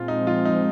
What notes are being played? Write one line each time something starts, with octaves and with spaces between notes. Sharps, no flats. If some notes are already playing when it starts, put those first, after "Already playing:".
Already playing: A#2 F3 G#3 C4 F4
D#4
F4
D#4